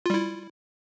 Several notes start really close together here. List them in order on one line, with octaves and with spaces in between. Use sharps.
F4 G3 E4